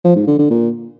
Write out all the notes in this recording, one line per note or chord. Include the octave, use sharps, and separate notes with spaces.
F3
G#2
D3
D3
A#2